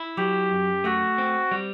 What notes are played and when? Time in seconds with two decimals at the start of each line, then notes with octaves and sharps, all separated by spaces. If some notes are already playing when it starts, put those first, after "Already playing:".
Already playing: E4
0.17 F#3 G4
0.51 F#2
0.84 A3 F#4
1.18 C4
1.51 G3